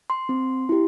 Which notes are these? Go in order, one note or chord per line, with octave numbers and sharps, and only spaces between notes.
C6
C4
E4 G4